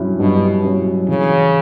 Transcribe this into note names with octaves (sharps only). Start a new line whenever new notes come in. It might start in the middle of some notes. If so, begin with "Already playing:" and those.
Already playing: G2 F#3 C#4 E4
G2 B2
F#3 C#4 E4
C#3 E3